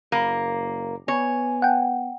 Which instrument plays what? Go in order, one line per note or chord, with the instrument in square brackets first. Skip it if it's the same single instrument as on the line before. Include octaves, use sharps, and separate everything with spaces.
[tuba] F#1 [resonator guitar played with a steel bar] A#3
[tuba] B3 [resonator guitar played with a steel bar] C#5 [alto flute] G#5
[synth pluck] F#5 G5